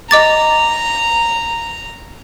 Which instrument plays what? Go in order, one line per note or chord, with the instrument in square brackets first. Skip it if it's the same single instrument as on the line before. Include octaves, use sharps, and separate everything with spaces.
[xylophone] D#5 D6 A6 [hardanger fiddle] A#5